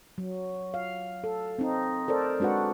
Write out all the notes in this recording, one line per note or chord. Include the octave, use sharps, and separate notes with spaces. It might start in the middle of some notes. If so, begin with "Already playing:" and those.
F#3
F5
A4
C4 D#4
A4 A#4 C5 D5
G#3 D4 F#4 B4 F#5